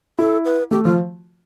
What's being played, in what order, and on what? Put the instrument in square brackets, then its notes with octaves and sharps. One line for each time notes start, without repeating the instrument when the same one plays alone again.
[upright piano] E4 [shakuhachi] A4
[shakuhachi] B4
[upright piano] A3 [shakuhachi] G4
[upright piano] F3 [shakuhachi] F4